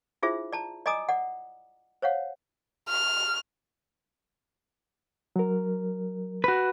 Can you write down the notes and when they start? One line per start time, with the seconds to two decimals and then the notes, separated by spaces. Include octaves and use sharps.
0.23 D4 E4 F4 G#4 C5 E5
0.53 D5 A5 A#5
0.86 D5 D#5 G#5 A#5 D6 D#6
1.09 D5 F#5
2.02 C5 C#5 F5 F#5
2.89 F6
5.36 F#3 A#4
6.44 F#4 B4